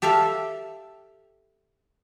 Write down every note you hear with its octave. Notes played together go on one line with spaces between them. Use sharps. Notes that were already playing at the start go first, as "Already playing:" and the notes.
G4 A4 E5 F5 A5